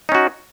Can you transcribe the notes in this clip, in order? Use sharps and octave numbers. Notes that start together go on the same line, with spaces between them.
C#4 D#4 F#4